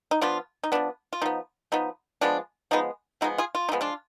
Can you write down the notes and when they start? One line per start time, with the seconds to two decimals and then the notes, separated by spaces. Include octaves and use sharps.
0.11 D#4
0.21 F3 B3 D4 F4
0.64 D#4
0.72 F3 B3 D4
1.13 F4
1.22 F3 B3 D#4
1.72 F3 B3 D#4
2.21 F3 G#3 B3 D4
2.71 F3 G#3 B3 D#4
3.21 F3 G#3 B3 D#4 F#4
3.38 F4 G#4
3.55 F4
3.69 D#4
3.72 F3 G#3 B3
3.81 D4 F4